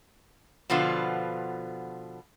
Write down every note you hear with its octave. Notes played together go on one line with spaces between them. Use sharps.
B2 D3 F3 B3 F4